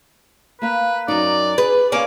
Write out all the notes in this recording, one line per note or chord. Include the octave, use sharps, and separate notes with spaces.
A#3 B4 F5
F#2 D#4 D5
G#4 B4
A#3 C#4 G#4 B4 D5 F5 D6